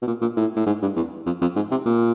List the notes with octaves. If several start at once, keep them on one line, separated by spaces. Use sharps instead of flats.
B2
A#2
A#2
A2
A2
G#2
G2
E2
F2
F2
G#2
C3
A#2